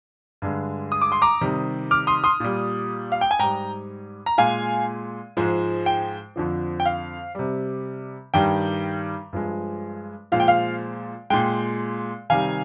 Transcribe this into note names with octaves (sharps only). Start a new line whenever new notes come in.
G2 D3 G#3
D#6
D6
C6
A#5 D6
C3 D#3 G3
D6 F6
C6 D#6
C6 D#6
A#2 G3
F5
G5
G#5
G#2 G3 G5 A#5
A#5
A#2 G#3 F5 G#5
G#2 F3 G#3
G5
F2 D3 F3
G5
F5
C3 G3
G2 D#3 G3 G5
G2 F3 G#3
A#2 F3 G#3 F5
G5
F5
A#2 G#3 G5
C3 D#3 G3 F5 G#5